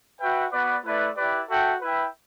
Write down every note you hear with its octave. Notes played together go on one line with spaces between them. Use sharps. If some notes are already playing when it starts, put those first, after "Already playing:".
F#4 B4 E5 G5
B3 F#4 B4 D5
A3 E4 B4 D5
E4 G4 B4 D5
F#4 A4 E5 G5
E4 B4 E5 G5